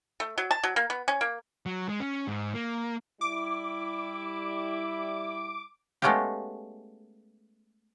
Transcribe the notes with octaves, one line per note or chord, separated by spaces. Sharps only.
A3
F#3
A5
F#3
A#3
B3
C#4
A#3
F#3
G#3
C#4
G#2
A#3
G3 E4 D6
G#3 A3 B3 C#4 F4 G4